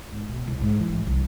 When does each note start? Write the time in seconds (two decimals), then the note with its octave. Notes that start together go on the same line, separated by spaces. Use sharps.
0.12 G#2
0.29 B2
0.48 C2
0.61 G#2
0.79 E3
0.92 A1
1.07 C2